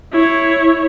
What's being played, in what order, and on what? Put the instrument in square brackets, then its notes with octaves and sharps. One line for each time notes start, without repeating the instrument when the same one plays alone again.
[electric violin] E4 C#5